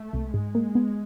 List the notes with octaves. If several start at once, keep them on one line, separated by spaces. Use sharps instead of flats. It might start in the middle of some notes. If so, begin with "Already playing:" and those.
Already playing: A3
C2
G#2 G#3
A#3
B3